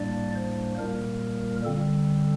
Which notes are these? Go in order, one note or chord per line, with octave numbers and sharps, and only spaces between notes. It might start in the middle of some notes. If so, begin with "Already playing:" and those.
Already playing: A2 G3 A#3 D4 D5
C5
A#2 G3 A#3 A#4
D3 G3 C4 A4